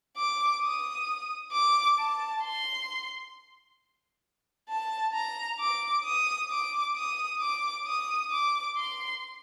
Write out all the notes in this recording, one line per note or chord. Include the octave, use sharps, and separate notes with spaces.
D6
D#6
D6
A5
C6
A5
A#5
D6
D#6
D6
D#6
D6
D#6
D6
C6